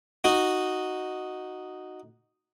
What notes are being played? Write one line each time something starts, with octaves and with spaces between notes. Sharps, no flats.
D#4 F#4